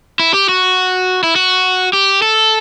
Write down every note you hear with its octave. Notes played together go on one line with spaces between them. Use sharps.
E4
G4
F#4
E4
F#4
G4
A4